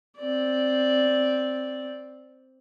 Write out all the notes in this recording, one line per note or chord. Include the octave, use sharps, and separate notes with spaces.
C4 D5